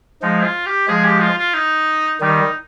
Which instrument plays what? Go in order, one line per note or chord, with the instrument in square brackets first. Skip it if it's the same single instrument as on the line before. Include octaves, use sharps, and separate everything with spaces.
[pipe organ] F3 G#3 [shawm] D#4
[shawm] F4
G4
[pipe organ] F3 G#3 [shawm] G#4
[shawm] G4
F4
F4
D#4
[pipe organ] D#3 G3 [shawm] D#4